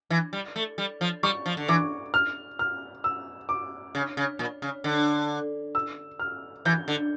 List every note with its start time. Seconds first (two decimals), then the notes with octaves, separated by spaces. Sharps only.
0.10 E3
0.33 G3
0.56 A3
0.78 G3
1.01 F3
1.23 G3 C#6
1.46 F3
1.57 D3
1.68 E3 D6
2.14 F6
2.59 F6
3.04 E6
3.49 D6
3.95 C#3
4.17 C#3
4.39 A#2
4.62 C#3
4.84 D3
5.75 E6
6.19 F6
6.65 E3 G6
6.88 D3